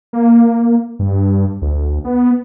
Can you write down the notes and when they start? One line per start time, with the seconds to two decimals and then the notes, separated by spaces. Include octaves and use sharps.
0.13 A#3
0.99 G2
1.62 D2
2.05 B3